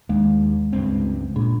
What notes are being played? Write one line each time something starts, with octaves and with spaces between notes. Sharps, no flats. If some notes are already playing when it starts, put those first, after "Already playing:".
D#2 G#3
C#2 G2 C4
A#2 D4